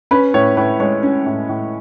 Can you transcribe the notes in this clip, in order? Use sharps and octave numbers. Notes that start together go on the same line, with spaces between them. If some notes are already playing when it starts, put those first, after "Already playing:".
C#4 B4 B5
A2 C#5
A2 B4
G#3 C#5
C#4
A2
A2